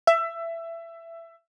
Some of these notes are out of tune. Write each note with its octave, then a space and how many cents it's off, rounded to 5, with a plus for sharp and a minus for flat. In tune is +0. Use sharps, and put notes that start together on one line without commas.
E5 +20